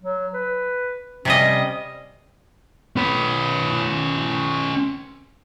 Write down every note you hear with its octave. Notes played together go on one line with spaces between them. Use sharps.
F#3
B4
C3 G3 C#4 D#5
C#4 B4